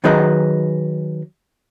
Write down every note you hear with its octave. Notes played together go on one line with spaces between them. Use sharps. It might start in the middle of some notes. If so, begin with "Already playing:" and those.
D#3 F#3 D#4 G#4 B4 D#5